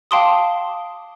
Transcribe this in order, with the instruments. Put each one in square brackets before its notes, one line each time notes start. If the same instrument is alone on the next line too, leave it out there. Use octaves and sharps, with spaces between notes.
[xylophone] F5 G5 A5 C6 D6 D#6